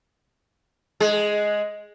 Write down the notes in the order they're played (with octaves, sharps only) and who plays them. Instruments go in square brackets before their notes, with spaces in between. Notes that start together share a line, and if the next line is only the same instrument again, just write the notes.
[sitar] G#3 G#4